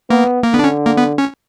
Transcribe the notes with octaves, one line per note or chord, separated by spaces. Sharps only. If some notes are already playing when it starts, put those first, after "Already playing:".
A#3 B3
A#3
D3 B3
D4
C#4
A#3
B3
C#4